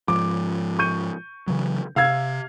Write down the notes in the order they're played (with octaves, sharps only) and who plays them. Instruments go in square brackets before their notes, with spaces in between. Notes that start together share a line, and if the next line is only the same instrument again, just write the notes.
[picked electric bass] G#2 F3 [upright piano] D6
[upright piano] C#6 G6 D#7
[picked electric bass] C#3 E3 F#3
[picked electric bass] C3 [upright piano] F5 E6 G#6